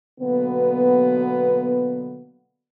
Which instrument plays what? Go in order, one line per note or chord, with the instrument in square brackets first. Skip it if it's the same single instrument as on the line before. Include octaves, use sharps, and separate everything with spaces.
[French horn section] B2 D3 F#3 A#3 B3